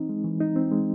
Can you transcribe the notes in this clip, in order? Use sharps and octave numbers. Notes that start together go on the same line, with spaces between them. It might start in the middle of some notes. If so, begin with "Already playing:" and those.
Already playing: E3 C4 D#4
G#3
E3
D#4
C4
G#3